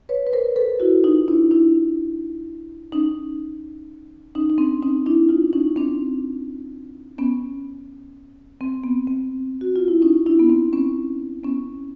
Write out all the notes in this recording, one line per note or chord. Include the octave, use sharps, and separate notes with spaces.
B4 C#5
B4
A#4 C5
A4 B4
E4 F#4
D#4 F4
D4 E4
D4 E4
C#4 D#4
C#4 D#4
D#4
C4 D4
C#4 D#4
D4 E4
D#4 F4
C#4 D#4
C4 D4
B3 C#4
C4
B3
C4
F#4
F4
E4
C#4 D#4
D4 E4
B3
C4
B3 C#4
B3 C#4